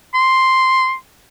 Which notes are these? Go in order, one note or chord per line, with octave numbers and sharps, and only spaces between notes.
C6